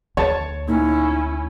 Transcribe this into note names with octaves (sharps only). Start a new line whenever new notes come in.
D2 C#5 A5
A#2 C#4 D#4 E4